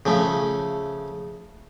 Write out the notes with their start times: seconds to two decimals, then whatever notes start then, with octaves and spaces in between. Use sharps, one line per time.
0.06 C#3 F3 A3